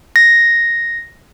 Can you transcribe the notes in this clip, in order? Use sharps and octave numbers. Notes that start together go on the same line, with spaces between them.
A#6